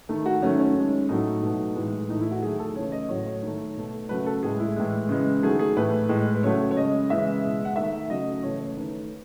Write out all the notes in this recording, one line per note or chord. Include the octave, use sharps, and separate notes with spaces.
D#3 A3
F#4
D#3 F#3 A3 C#4
C#4
D#3 G#3
A2 F#3 A3 D#4
B2 F#3 A3
A2 E3 G#3
A2 E3 A3 D#4
E4
F#4
D#3 F#3 A3 G#4
A4
C#3 E3 A3 C#5
D#5
A2 F#3 A3 C#5
C#5
D#3 A3
B2 A3
C#3 F#3 A3 B4
A4
A2 G#3 G#4
E4
A2 E3 G#3
C#3 E3 G#3
D#3 F#3 A3 G#4
G#4
A2 E3 A3 B4
A2 G#3
B4
C#3 F#3 A3 C#5
C#5
C#3 G#3 D#5
C#3 E3 G#3 E5
B2 G#3
F#5
D#3 A3 E5
C#3 F#3 A3 D#5
C#3 E3 A3 C#5
C#5
D#3 A3 B4